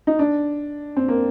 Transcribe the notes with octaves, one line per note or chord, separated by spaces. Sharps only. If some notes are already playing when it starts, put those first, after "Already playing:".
D#4
D4
C4
A#3